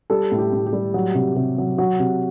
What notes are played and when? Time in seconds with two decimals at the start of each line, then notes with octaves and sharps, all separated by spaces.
0.10 G3 A4
0.32 A2
0.38 G4
0.53 A2
0.66 G4
0.73 G3
0.94 F#3
1.15 C3
1.36 C3
1.58 F#3
1.78 F#3 F#4
1.99 C3